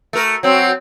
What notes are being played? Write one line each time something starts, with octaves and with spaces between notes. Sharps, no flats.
A3 A#4
F#3 C4